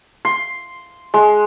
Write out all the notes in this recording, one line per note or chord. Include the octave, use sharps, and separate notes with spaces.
C6
G#3